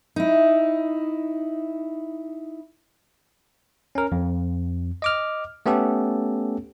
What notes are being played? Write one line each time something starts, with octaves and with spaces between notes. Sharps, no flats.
D#4 E4
C#4 A#4
F2
D#5 D6 F6
A3 B3 C#4 G4 A4